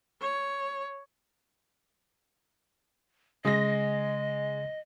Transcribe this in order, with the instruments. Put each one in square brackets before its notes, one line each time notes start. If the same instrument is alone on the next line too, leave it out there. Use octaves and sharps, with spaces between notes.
[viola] C#5
[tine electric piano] C#3 D#6 [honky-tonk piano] G#3 A#6 [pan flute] D#5